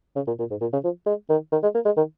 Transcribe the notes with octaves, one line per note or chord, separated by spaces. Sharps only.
C#3
A#2
A#2
G#2
A#2
C#3
F3
G#3
D#3
D#3
G#3
A#3
G#3
D#3